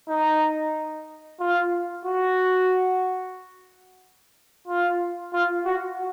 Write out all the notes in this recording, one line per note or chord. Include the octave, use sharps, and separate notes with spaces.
D#4
F4
F#4
F4
F4
F#4